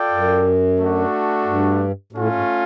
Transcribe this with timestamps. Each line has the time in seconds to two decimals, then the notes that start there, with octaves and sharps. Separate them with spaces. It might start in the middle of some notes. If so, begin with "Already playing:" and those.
Already playing: F4 A4 D5 G5
0.11 F#2
0.79 A3 D4 F#4
1.45 G2
2.13 A2 A3 C#4 F4
2.35 G#2